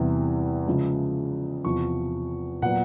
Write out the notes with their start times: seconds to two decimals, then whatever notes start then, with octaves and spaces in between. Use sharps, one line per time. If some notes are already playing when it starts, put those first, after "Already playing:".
Already playing: E2 C3 E3 G3
0.67 C#3 F3 G#3
1.65 E2 C3 F3 C#6
2.62 A#2 F#3 B3 F#5